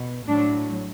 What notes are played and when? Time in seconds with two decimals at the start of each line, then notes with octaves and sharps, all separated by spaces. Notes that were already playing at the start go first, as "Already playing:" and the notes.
Already playing: B2
0.27 A2 F#3 D4